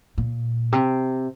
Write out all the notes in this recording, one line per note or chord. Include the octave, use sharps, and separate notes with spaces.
A#2
C3